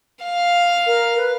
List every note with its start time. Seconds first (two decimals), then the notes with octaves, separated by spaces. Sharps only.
0.25 F5
0.86 A#4
1.17 B4